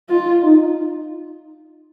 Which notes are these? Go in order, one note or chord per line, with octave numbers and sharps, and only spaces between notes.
D#4 F4
D#4